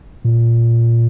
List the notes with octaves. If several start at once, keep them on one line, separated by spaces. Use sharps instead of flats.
A#2